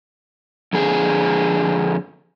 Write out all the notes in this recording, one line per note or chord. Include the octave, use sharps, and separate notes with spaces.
F2 D3 G#4